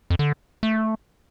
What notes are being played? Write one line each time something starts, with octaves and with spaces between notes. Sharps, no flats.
F2
D3
A3